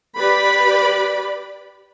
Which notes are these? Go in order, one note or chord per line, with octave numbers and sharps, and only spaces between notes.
G4 B4 D5 B5